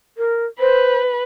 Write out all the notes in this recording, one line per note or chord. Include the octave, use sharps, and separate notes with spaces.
A#4
B4 C5